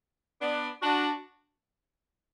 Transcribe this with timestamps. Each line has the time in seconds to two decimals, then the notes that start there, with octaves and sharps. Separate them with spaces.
0.41 B3 D4
0.82 D4 F#4